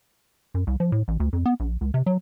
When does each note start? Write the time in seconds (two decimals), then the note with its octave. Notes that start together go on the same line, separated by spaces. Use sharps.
0.54 F#2
0.67 C2
0.80 F3
0.92 A2
1.08 A1
1.20 D2
1.33 F2
1.46 B3
1.60 A#1
1.81 C#2
1.94 C3
2.06 F#3